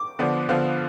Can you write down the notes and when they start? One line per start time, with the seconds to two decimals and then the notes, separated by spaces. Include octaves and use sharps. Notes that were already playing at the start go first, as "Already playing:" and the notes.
Already playing: D6
0.19 D3 F3 B3 D4
0.49 D3 F3 B3 D4 F5